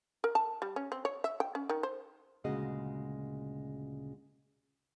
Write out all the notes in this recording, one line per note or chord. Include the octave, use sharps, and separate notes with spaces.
A#4
A5
G3
C#4
C4
C#5
E5
G5
C#4
D#3
C5
D2 A#2 C#3 G#3 F#4 D#5